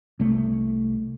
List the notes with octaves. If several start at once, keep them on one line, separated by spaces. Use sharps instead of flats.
C2 A3